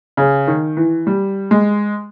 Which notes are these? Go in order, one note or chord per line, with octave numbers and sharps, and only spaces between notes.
C#3
D#3
E3
G3
G#3